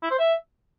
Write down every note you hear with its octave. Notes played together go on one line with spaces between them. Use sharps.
E4
C5
E5